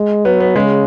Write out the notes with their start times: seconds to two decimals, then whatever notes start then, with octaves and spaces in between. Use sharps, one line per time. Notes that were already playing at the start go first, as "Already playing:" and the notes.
Already playing: G#3
0.25 F#3 B3
0.40 B3
0.56 C#3 G#3